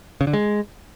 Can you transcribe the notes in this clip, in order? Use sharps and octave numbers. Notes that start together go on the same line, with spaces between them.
C#3
D3
G#3